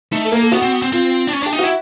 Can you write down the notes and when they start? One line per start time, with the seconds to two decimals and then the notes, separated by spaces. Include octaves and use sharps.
0.12 A3 D#4
0.25 A4
0.32 A#3 A#4
0.42 A4
0.52 B3 F#4
0.62 C4
0.72 B3
0.82 C4
0.92 C4 F4
1.27 D4
1.33 C#4
1.43 D4 G4
1.53 D#4
1.59 E4 F#4